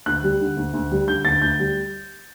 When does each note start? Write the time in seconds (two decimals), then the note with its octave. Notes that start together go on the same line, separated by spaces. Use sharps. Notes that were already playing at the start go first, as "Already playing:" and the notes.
0.06 D2 F#6
0.23 G3
0.41 D3
0.57 D2
0.73 D2
0.91 G3
1.08 D3 G6
1.25 D2 A6
1.42 D2 G6
1.59 G3